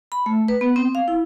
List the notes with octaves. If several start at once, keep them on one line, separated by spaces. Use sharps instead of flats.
B5
A3
B4
B3
C4
F5
E4